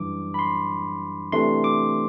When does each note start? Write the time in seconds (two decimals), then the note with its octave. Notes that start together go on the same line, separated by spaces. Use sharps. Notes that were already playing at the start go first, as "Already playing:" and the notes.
Already playing: F#2 E3 G3 D4 D6
0.34 B5
0.39 C6
1.32 C3 E3 A3 D4 C6
1.64 D6